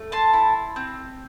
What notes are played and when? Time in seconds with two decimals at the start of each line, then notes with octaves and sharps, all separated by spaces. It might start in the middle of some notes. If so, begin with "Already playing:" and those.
Already playing: A3
0.12 A5 C6
0.33 E4
0.76 C4